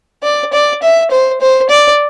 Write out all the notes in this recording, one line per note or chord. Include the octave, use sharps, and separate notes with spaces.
D5
D5
E5
C5
C5
D5